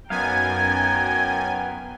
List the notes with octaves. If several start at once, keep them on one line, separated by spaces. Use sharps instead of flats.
F#2 B3 D#4 F5 G5 G#5 A#5 G#6